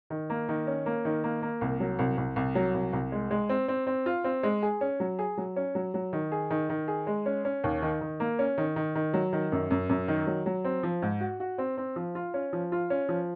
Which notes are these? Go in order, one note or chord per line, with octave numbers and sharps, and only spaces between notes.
D#3
A#3
D#3
C#4
A#3
D#3
A#3
A#3
C2
F#3
C2
C2
C2
F#3
C2
C2
G#3
G#3
C4
C4
C4
F4
C4
G#3
G#4
C#4
F#3
G#4
F#3
C#4
F#3
F#3
D#3
G#4
D#3
D#3
G#4
G#3
C#4
C#4
D#2
D#3
D#3
A#3
C#4
D#3
D#3
D#3
F#3
D#3
F#2
F#2
F#2
D#3
F#3
F#3
C4
F3
G#2
F#4
F#4
C4
C4
F3
F4
C#4
F3
F4
C#4
F3